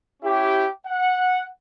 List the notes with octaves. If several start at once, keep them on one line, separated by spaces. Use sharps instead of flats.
C#4 E4 G4
F#5